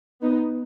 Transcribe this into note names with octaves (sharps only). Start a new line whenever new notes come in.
B3 D#4